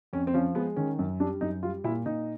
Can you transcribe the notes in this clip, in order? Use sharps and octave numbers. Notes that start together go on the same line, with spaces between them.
F2 C#4
C4
F3 C#4
G#3 B3
D#3 C#4
F#2
G3 D4
F#2 D#4
G3 F4
A#2 E4
A#2 D#4